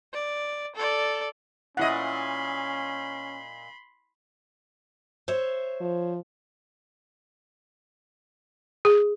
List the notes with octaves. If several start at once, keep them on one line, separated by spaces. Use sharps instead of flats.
D5
A4 D5
A#2 C#4 E4 D#5 F#5 B5 C6
C5 C#5 E5
F3
G#4